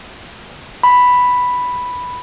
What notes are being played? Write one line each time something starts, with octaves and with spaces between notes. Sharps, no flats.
B5